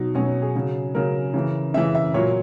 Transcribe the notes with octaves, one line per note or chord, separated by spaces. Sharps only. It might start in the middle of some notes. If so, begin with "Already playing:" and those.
Already playing: B2 F#3 D#4
B2 F#3 C#4
G#4
C#3 F#3
C#3 F#3 A#4
C#3 E3
C#3 E3 E5
E5
A#2 F#3 C#5